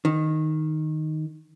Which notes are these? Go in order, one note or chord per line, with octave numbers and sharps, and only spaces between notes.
D#3